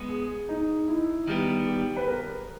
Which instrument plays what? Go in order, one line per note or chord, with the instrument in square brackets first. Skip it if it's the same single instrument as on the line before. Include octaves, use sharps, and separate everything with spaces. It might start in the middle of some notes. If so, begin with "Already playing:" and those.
Already playing: [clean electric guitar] G#3 B3
[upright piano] G#4
D#4
E4
[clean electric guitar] D#3 G3 B3 [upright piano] G4
[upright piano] G4
B4
A#4